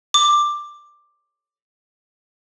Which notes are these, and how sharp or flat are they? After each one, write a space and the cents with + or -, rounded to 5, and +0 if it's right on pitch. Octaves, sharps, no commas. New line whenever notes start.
D6 +10